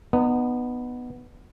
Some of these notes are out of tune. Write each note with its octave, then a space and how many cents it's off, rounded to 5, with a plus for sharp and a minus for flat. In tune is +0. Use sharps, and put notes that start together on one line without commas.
B3 +0 D#4 -35